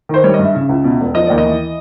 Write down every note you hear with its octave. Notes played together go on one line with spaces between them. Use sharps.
D#3 C5
G3 C#5
D#5
G2
E5
C#3
C#2
B2
E1
F3 D#5
D#2 D5
D#5
E3